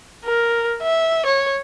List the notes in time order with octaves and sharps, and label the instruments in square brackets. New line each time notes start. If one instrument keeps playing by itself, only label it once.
[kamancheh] A#4
E5
C#5